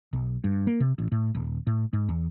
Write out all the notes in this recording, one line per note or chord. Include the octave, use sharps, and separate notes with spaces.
B1
G2
A#3
C3
A1
A2
D#1
A2
G#2
E2